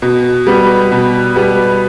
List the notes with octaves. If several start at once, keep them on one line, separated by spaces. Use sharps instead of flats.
B2
G3 B3
B2
G3 B3